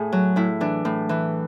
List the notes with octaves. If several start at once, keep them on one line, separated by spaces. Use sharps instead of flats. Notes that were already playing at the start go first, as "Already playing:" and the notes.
Already playing: A2 G#4
F#3
A2 E4
E3 D4
A2
E3